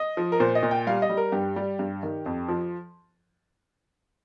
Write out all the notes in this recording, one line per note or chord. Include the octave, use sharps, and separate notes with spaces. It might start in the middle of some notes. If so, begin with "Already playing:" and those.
Already playing: D#5
F3
A#4
A#2 C5
D#5
A#2
G5
G3 F5
D#5
G3
A#4
G2 G4
G3
G2
D#3
F2
F3